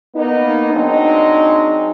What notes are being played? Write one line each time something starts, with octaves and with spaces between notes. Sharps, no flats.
A#3 B3 D#4
F#3 G#3 C4 D4 D#4